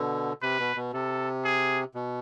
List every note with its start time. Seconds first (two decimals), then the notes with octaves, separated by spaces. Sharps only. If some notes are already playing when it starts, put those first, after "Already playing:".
Already playing: B2 D3
0.42 C3 B4
0.60 B2
0.76 B2
0.93 C3 A4
1.44 G#4
1.95 B2